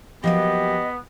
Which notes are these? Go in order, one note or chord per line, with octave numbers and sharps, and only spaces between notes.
F3 F#3 A#3 B3 G4 D#5